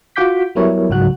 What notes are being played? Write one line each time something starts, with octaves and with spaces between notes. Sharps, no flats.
F4 F#4 F#5 D6 G6 B6
F#3 G3 B3 E4 A#4 C#5
C#2 G#2 F#3 F#4 F#6